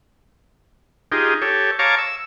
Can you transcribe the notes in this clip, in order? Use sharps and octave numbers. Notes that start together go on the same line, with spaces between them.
D#4 F4 G4 G#4
G4 A4 C#5
C#5 F5 A5 A#5 C#6 D6
E6